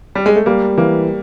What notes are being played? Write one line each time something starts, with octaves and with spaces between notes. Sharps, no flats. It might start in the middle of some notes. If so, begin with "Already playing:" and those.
G3
G#3
A3
G3 A#3
E3 A#3